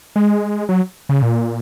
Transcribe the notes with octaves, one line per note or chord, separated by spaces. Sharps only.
G#3
F#3
C#3
A#2